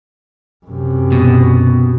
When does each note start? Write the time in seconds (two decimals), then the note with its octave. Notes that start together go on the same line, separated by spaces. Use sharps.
0.66 F#2 C3
1.12 B2